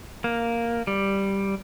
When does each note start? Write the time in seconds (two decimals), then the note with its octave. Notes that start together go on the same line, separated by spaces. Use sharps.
0.24 A#3
0.87 G3